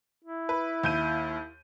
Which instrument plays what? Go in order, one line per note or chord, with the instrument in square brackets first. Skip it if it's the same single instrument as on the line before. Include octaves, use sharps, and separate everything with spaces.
[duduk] E4
[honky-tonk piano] B4
D#2 G6 D#7